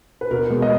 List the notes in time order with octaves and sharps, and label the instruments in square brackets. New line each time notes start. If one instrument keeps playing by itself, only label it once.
[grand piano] B4
B2 A#4
G#3 B3
D#5